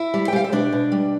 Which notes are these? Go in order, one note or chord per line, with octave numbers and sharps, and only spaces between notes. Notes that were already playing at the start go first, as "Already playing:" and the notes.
Already playing: E4 E5
G3
G5
G3 F5
E5
B2 D4 D5
B2
G3